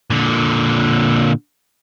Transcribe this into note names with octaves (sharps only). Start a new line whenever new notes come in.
A#2 D3